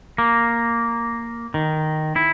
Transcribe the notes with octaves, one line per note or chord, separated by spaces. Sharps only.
A#3
D#3
E4